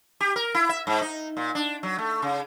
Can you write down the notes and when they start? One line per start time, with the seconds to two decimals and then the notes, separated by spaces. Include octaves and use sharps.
0.20 G4
0.36 A#4
0.54 E4
0.69 E5
0.87 G#2
1.01 D#4
1.37 A#2
1.55 D4
1.83 F#3
1.98 A3
2.22 C#3